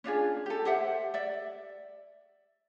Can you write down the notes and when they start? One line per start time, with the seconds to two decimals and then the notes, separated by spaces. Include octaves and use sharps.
0.04 C#4 D4 F4 G#4
0.46 G4 A4
0.65 G4 C5 E5 F#5
1.14 D5 E5